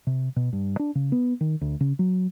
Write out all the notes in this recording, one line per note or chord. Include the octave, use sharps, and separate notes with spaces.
C3
B2
G2
D4
C#3
B3
D#3
D2
C#3
F#3